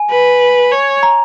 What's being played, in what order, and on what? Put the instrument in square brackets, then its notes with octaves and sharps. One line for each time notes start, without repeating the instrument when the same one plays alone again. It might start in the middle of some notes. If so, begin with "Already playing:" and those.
Already playing: [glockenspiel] G#5
[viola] B4
C#5
[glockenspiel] A#5